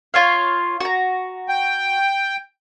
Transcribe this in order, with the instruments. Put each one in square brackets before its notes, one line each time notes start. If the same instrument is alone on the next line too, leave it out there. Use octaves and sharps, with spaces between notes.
[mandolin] F4 C#5 F5
F#4 A#5
[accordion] G5